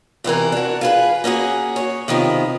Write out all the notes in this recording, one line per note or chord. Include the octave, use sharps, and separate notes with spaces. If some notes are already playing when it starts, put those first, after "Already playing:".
E2 C3 E3 A#4
D4 F#4
F4 G#4 B4
A#3 C#4 F#4 G#4
C#5
C3 D#3 F3 B3